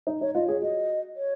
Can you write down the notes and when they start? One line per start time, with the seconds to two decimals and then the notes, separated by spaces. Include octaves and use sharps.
0.07 D#4
0.21 D#4 C#5
0.35 F4 D#5
0.48 G#4 C#5
0.62 F#4 D#5
1.16 C#5